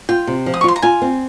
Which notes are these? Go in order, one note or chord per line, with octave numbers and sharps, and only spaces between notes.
F4 G5
C3
F3
D#6
C#6
F4 C6
A#5
F4 G#5
C4